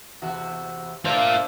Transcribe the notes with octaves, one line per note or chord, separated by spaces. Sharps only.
E2 C3 F#4
D4 A#4 C5 D5 E5 F5